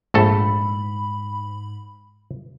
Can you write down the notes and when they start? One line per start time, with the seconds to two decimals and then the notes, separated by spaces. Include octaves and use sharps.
0.14 A#1 G#2 A3 A4 B5